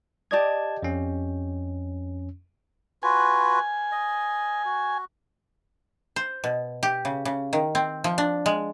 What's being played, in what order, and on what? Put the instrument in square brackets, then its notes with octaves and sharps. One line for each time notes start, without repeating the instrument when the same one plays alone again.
[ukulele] G4 D5 D#5 [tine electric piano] A5 G#6
[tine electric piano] F2 C#4
[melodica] F4 F#4 B4 [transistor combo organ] G#5
[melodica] D#5
F#4
[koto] C5
B2
G4
C#3
C#3
D#3
C4
F3
D4
G#3